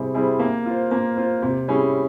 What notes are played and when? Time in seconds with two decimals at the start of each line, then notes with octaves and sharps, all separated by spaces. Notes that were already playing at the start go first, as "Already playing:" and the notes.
Already playing: C3 G3 C4 E4 G#4
0.14 G3 C4 E4 G#4
0.39 A#3
0.66 F4 C5
0.91 A#3
1.17 F4 C5
1.42 C3
1.68 G3 C#4 E4 G#4